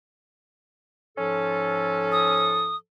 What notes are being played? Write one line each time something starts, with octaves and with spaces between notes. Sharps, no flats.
G#2 F3 C#4 A4
D#6